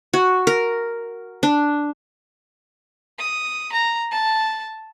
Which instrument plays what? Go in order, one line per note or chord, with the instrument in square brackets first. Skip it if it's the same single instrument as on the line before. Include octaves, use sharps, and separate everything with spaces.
[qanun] F#4
A#4
D4
[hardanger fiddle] D#6
A#5
A5